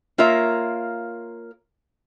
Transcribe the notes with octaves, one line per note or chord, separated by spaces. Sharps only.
A#3 F4 A#4 C#5 E5